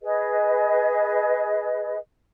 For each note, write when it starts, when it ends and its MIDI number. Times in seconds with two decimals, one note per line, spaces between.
0.03 1.97 68
0.03 1.97 71
0.03 1.97 75